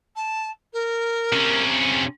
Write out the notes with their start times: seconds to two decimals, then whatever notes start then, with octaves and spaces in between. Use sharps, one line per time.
0.16 A5
0.73 A#4
1.32 C3 C#4